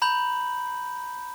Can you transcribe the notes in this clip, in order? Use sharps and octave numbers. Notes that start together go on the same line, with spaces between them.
A#5 B5 G6 F#7